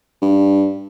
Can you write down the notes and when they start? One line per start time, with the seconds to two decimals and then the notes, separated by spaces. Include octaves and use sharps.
0.22 G2